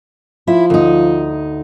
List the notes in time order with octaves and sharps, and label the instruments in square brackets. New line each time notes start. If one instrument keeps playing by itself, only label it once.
[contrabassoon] F3 [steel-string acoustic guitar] E4
[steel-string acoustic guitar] D2 D#4